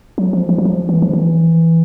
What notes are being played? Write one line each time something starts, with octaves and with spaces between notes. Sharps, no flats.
F#3
F3
F3
F#3
F3
E3
F3
E3